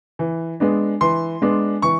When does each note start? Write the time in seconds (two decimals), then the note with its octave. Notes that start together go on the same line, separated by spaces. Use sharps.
0.19 E3
0.60 G#3 B3 D4
1.01 E3 C6
1.42 G#3 B3 D4
1.82 E3 C#6